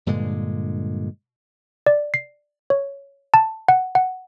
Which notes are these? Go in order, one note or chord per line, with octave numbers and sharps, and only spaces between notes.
G2 A#2 D3 G#3
D5
C7
C#5
A5
F#5
F#5